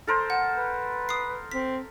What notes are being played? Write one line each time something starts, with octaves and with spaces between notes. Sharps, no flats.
A4 A#4 C5
F#5
B4
D#6 C7
C4 B6